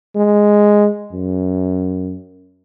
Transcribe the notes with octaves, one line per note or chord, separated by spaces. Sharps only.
G#3
F#2